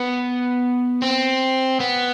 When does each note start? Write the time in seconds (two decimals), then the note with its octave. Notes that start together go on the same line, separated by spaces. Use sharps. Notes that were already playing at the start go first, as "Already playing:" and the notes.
Already playing: B3
1.02 C4
1.80 B3